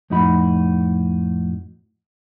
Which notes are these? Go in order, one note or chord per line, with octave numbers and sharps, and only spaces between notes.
F2 A2 D#4 F#4 B5